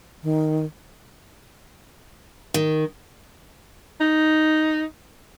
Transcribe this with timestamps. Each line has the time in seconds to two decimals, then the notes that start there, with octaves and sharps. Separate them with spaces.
0.23 D#3
2.54 D#3
4.00 D#4